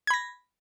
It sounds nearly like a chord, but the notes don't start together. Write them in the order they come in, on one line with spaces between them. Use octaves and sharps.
G#6 B5 A#6